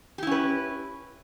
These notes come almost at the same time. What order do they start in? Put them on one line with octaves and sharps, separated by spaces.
G4 E4 C#4 B4